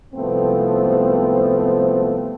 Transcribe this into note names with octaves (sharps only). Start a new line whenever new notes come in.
C2 G#2 F3 A3 B3 C4